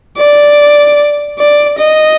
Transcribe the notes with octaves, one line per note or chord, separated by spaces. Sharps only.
D5
D5
D#5